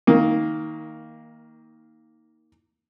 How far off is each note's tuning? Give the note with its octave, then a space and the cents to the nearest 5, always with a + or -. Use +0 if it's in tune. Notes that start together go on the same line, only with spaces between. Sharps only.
D#3 +25 A#3 +0